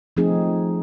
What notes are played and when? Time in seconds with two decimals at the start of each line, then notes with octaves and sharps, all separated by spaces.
0.17 F3 A3 C4 D#4 G#4